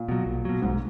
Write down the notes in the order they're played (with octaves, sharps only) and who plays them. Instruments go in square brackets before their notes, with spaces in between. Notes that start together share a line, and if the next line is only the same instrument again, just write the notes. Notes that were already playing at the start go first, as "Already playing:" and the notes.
Already playing: [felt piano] A#2
[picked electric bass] B2 F#3
B1
B2 F#3
[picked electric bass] B1 [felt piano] G#2